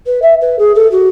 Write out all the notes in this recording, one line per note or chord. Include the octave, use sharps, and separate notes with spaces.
B4
E5
B4
G#4
A4
F#4